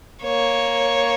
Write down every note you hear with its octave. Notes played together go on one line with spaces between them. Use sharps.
A#3 C#5